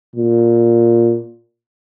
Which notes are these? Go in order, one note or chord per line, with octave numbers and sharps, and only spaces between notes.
A#2